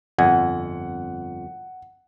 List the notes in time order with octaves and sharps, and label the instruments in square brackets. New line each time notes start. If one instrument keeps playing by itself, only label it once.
[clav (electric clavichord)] G1 F2 G#5 [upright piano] F#5